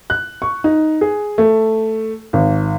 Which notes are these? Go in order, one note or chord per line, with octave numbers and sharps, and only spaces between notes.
F#6
C#6
D#4
G#4
A3
G#1